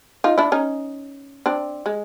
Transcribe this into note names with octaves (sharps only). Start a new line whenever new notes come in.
D#4 F4
D4 E4
C#4 D#4
C4 D4
G#3